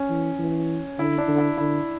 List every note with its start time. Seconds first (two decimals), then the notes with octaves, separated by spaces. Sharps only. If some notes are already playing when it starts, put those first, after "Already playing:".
Already playing: C#4
0.09 E3
0.39 E3
0.99 D3 E4
1.18 D4
1.28 D3
1.38 E4
1.58 D3 E4